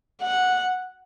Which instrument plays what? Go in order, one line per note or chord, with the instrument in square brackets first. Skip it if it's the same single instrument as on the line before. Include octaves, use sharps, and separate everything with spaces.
[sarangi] F#5